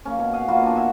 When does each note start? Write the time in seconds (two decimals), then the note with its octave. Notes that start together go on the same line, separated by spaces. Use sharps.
0.05 A#3 C#4
0.19 B2
0.33 D#5 F5 F#5
0.48 A#3 B3 F4 F#4
0.62 D#3 D4
0.75 E5 F#5 G#5